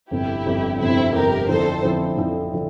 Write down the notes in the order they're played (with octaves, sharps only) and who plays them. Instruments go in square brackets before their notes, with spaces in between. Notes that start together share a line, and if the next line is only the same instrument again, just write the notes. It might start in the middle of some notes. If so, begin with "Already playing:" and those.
[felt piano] G1 F2 C3 [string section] E4 G4
[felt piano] G1 F2 C3
[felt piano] G1 F2 C3 [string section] C4 E4
[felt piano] G1 F2 C3 [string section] G4 A#4
[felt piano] F2 D3 F3 C4 E4 [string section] A4 C5
[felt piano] F2 D3 F3 C4 E4
F2 D3 F3 C4 E4
D3 F3